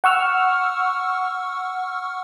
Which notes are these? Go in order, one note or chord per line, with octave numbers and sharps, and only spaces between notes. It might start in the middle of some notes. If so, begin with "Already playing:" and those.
F#5 C#6 E6 F6